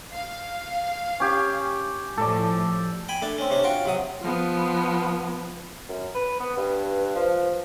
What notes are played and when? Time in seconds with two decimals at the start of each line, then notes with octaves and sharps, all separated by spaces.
0.14 F5
1.20 C#4 G4 G#5
2.17 A2 F3 A4 D5
3.08 G5 G#5 B5
3.22 A3 D4 A5
3.38 C4 C#4
3.51 C3 C#4 D4
3.64 F4 F#4 G5
3.86 C3 F#3 D#6
4.21 F3 B3
5.89 F#2
6.15 B4
6.40 B3 B4
6.57 G2
7.15 F3